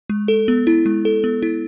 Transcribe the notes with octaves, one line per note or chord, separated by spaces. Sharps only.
G#3
A4
B3
E4
G#3
A4
B3
E4